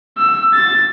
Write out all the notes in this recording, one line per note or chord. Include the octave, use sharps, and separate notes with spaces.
E6
A6